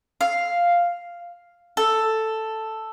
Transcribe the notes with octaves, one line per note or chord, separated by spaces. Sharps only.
F5
A4